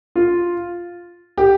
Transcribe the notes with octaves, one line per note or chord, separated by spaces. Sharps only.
F4
G4